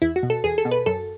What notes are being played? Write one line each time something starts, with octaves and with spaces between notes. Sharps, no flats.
E2 E4
F#4
B2
A4
E2 G#4
A4
B2
B4
F#2 A4